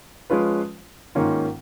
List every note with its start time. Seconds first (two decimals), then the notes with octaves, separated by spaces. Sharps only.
0.30 F3 G#3 C#4 F4 B4
1.15 G#2 D#3 A#3 C#4 F4